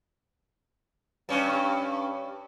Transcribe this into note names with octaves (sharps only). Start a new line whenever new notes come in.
G2 C#4